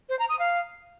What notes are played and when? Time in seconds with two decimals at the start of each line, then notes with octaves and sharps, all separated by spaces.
0.09 C5
0.19 A#5
0.29 D#6
0.39 F5